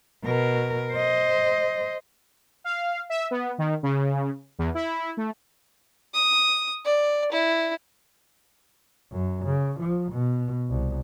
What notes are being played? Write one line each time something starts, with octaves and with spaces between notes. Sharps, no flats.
B2 A#4
C5 D#5
F5
E5
B3
D#3
C#3
E2
E4
A3
D#6
D5
E4
F#2
C#3
F3
B2
C2